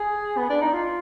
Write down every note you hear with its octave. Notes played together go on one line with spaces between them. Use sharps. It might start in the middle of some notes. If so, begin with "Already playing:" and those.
Already playing: G#4
B3
D4
D#4
F4